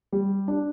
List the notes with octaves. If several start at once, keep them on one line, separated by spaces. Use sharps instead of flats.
G3
D4